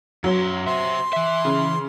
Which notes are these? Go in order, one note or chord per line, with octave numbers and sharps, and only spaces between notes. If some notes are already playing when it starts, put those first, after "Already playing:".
F#2 F#3 C6
C5 E5 C6
E3 E5
C#3